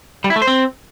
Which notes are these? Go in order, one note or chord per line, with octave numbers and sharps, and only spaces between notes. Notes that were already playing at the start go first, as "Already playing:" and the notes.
G3
E4
A3
C5
C4